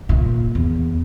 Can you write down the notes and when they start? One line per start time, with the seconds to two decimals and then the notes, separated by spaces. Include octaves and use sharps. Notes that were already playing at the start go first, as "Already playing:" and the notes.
0.09 A#2
0.55 E2